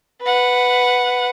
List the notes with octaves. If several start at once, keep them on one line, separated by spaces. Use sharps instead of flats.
B4 F#5